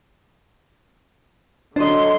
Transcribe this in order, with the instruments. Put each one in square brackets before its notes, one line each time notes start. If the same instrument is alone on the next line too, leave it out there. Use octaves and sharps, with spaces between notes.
[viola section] D3 F#3 C6 [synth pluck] D4 [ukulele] C5 D#5